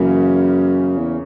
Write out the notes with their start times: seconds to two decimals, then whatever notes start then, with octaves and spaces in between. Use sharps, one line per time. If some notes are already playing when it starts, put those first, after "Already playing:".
Already playing: F#2 C#3 E3 A#3 C#4
0.98 E2